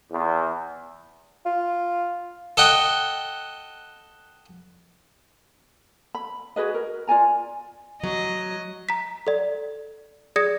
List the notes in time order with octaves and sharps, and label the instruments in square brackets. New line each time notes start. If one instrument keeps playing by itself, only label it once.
[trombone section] E2
[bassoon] F4
[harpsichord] A4 D#5 F#5 G5
[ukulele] B5
F#4 G#4 B4 D#5
A#4
F4 D5 G#5 A#5
[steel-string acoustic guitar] F#3 [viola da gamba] D#5
[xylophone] A#5 B6
A4 D5
G#4 D5 D#6 G#6 A#6 C#7